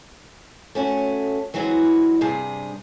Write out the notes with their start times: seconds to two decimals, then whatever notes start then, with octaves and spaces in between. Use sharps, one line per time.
0.75 A3 C#4 F#4
1.54 E3 F#3 G#3 C4 F#4
2.21 G2 C3 G#4